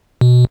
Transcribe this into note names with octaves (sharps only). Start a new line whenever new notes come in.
B2